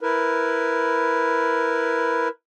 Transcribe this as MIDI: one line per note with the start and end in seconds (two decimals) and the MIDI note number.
0.01 2.28 64
0.01 2.28 70
0.01 2.28 71